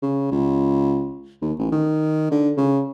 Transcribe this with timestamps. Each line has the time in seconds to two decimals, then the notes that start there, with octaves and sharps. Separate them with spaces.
0.02 C#3
0.32 C#2
1.42 D#2
1.59 A1
1.72 D#3
2.31 D3
2.57 C#3